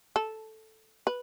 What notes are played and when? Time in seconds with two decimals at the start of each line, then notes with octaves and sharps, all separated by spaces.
0.16 A4
1.07 B4